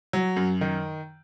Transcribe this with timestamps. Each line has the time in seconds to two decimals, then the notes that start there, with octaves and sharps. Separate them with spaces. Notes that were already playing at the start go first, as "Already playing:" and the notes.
0.13 F#3
0.37 F#2
0.61 D#3